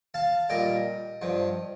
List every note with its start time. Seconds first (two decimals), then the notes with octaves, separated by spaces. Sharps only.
0.14 F5 A5
0.50 A#2 G3 D#5 G5
1.22 G2 F3